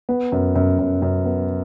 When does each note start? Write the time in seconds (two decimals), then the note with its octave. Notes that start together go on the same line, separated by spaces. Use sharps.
0.09 B3
0.32 F#2
0.55 F#2
0.79 F#2
1.02 F#2
1.25 B3